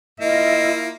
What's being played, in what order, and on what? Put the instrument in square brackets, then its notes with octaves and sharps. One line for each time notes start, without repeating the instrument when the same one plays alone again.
[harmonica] A#3 [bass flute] E4 [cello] F4 E5 [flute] D#5